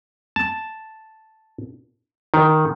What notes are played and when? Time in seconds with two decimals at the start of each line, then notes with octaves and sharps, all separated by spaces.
0.36 A5
2.34 D#3